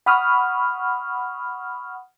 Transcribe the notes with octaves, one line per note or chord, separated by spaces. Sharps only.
F#5 B5 C#6 D#6 F6